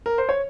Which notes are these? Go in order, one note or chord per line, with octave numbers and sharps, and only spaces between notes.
A#4
C5
C#5